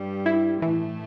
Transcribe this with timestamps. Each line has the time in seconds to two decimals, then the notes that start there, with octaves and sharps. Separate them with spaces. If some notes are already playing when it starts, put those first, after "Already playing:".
Already playing: G2 G3
0.26 E4
0.62 A2 E3 A3